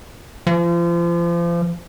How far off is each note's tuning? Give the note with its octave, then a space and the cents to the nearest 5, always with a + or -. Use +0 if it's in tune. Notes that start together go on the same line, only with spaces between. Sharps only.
F3 -35